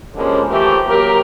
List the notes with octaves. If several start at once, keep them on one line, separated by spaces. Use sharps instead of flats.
D3 F3 G3 G#3 A#3 C#4
E3 F3 A3 E4 G4 A#4
F#3 A#3 G4 A#4